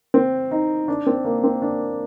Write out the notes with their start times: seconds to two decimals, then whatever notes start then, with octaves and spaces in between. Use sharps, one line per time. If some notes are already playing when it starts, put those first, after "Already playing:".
0.14 C4
0.51 D#4
0.88 D4
1.07 C4
1.24 A#3
1.44 C4
1.62 D4